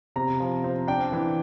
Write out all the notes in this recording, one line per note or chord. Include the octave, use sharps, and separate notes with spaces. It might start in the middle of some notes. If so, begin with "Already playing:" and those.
C3 A#5
F3
C4
D4 G5
E3